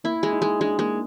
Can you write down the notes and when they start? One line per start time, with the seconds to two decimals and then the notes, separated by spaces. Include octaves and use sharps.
0.04 A#3 E4
0.23 G#3
0.33 D#4
0.42 G#3
0.60 G#3 D4
0.79 G#3 A#3